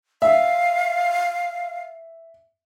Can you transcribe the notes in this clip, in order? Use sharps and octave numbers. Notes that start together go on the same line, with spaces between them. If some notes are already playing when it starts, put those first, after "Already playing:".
E5 F5